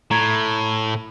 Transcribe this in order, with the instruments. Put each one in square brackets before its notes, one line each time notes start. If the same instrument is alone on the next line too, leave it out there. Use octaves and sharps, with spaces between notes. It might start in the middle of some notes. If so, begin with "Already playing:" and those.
[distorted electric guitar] A2 [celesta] A#5 G#6